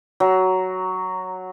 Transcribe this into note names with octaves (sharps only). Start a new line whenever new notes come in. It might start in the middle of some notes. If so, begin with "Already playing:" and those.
F#3